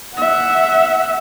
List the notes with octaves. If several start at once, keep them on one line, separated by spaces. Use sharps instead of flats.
E5 F#5